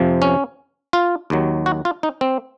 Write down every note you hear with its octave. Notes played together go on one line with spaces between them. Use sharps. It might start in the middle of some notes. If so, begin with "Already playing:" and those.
Already playing: F2 C3 F3
C#4
F4
D#2 D#3 F#3
F#4
F4
D#4
C4